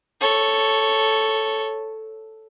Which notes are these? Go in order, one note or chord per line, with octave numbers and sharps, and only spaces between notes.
A4 C#5